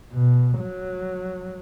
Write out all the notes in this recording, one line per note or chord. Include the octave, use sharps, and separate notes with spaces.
B2
F#3